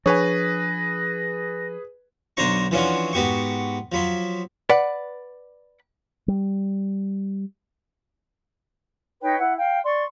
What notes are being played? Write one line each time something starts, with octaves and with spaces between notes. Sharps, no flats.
F3 D4 G#4 B4 C#5 G#5 A#6
B1 D3 D4 C5 A#5 C#6
E3 F3 C#4 D4 F4 F#4
G#2 B3 F#4 G4 C#6
F3 F#3 B5 C6
B4 D5 F#5
G3
D#4 B4 C#5 G5
E4 F#5
F5 G5
D5 C6 C#6